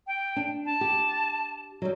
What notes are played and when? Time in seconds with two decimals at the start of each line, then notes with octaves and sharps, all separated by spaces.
0.07 G5
0.36 D4
0.65 A5
0.81 G4
1.82 F#3 G3